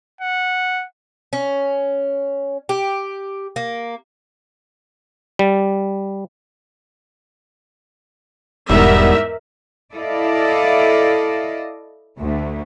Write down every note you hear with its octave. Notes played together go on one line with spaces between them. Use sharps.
F#5
C#4
G4
A#3
G3
E1 E2 G#2 G3 B3 A#4 E5
E4 A4 D5 D#5 F5
D2 A3